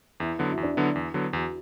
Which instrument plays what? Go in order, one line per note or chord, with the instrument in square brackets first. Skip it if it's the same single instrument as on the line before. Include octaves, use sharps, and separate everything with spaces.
[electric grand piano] E2 [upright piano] E4
[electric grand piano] D3 F#3 B3 [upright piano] F#4
[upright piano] E4
[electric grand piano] E2
[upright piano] D4
[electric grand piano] D3 F#3 B3 [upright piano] E4
[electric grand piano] E2
D3 F#3 B3
[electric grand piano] E2 [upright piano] F#4